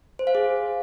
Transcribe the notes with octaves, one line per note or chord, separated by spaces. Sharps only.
C5
F5
G#4